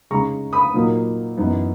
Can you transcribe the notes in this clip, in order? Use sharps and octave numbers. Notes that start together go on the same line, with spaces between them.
C#3 G#3 D#4 A#5 C#6
B5 D#6
A#2 F#3 A#3 D#4
F#2 E3 B3 D#4